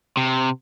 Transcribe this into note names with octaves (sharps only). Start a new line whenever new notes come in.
C3